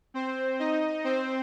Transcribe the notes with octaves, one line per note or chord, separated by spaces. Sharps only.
C4 C5
D#4 D#5
C4 C5